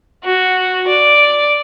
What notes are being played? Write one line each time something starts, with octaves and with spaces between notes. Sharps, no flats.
F#4
D5